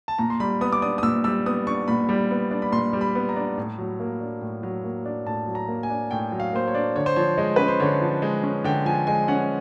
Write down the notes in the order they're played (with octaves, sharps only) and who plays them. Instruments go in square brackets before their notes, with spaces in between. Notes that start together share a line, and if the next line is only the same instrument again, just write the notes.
[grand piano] A5
A#2 A#5
C6
G3 B5
B3 D#6
D6
D4 D#6
D#6
A#2 E6
G3 E6
B3 D#6
D4 C#6
A#2 B5
G3
B3
D4
B5
A#2 C6
G3
B5
B3
A#5
D4
A2
F#3
A#3
D4
A2
F#3
A#3
D4
A2 A5
F#3
A#5
A#3
G#5
D4
A2 G5
F#3
F5
A#3 C5
C#5
D4
D3 C#5
C5
F3 C#5
G#3
C#4 B4
C5
D3 C#5
F3
G#3
C#4
D3 G5
F3 G#5
G#3 G#5
C#4 F#5